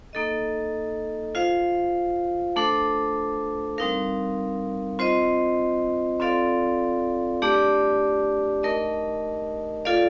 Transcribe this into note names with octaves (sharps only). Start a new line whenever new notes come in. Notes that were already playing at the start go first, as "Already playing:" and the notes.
A#3 D#4 A4 D#5
F4 C5 F5
A3 D4 A4 C5
G3 C4 D#4 A#4 F5
C4 F4 C5 D#5
C4 F4 A4 D5 F5
A3 D4 G4 D5
A3 D#4 A#4 D#5
F4 A4 D5 F5